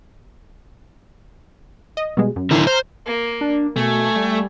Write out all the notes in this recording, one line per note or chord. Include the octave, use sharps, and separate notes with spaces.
D#5
B2 G3 G#3
F#2
D3 D#3 E4 C6
C5 A#5 F6
A#3
D4
B2 A3 G#5
G3